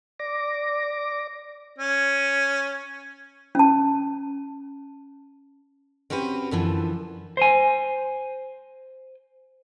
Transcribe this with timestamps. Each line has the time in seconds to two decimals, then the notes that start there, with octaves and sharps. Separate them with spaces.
0.19 D5 D6 A#6
1.78 C#4
3.55 C#4 A5
6.10 C4 C#4 F#4 G4 B4
6.51 F#2 D3 E3 F3
7.37 C5 G#5